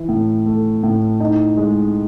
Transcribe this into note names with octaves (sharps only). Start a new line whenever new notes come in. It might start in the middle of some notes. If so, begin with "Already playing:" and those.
Already playing: E3
A2
A3
A2
D#4
G#3